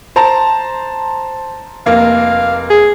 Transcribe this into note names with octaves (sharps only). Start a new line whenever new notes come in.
C5 A5 A#5
F1 A#3 F5
G#4